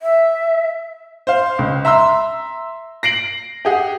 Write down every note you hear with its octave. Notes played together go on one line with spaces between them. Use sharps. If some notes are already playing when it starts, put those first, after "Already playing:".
E5
C5 F5
C#2
E5 A#5 C6 E6
A#6 C7 D7 F#7
G4 G#4 F#5